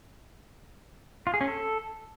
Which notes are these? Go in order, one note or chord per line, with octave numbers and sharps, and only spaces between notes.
F4
G#4
C#4
A4